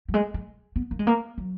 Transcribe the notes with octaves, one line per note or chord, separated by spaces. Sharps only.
F#3
G#3
G#3
B3
A#3
G#3
A#3
F#3